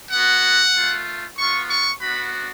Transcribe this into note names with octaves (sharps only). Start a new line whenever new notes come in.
B3 F#4 F#5
A3 F4
B3 F4 C#6
C#6
B3 D4 F#4 B5